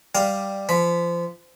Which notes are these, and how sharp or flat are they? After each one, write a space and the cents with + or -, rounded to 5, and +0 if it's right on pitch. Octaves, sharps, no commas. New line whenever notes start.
G3 +5 F5 +0
F3 -25 B5 +0